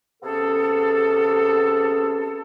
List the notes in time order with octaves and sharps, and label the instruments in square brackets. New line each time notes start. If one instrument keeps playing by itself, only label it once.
[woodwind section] C3 B3 C#4 G#4 A4